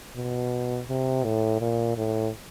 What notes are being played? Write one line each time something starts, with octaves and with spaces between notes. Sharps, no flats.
B2
C3
A2
A#2
A2